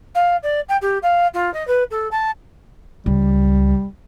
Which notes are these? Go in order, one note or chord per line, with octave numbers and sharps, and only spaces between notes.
F5
D5
G5
G4
F5
F4
D#5
B4
A4
A5
C#2 G3